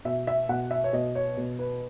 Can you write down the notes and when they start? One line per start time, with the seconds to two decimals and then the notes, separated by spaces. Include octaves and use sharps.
0.05 B2 E5
0.27 E5
0.49 B2 F#5
0.71 E5
0.84 C#5
0.93 B2 D#5
1.15 C#5
1.37 B2
1.59 B4